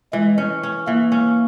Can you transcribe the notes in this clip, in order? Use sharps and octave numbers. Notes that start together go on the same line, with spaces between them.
E3 G#3
C#4
C#4
E3 A#3
C#4